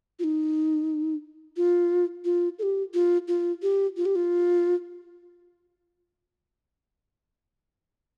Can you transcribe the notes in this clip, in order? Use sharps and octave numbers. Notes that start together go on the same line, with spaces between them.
F4
D#4
F4
F4
A4
G4
F4
F4
G4
F4
G4
F4